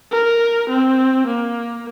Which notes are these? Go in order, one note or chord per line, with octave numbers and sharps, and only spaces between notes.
A#4
C4
A#3